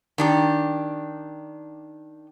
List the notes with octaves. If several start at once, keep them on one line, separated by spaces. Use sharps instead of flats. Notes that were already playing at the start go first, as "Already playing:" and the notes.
D#3 D4 G4